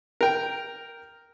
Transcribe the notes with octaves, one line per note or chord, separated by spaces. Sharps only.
A#4 G5